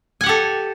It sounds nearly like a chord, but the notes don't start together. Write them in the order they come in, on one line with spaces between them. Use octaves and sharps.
G#5 F#5 G4 A4